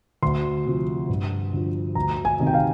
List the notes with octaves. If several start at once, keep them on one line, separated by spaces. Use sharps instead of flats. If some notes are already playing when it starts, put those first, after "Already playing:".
D2 C6
C3 F3
G2
D3 F3
D2 A#5
G#5
C3 D#3
G5
F5